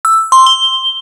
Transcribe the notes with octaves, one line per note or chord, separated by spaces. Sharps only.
E6
C6
G7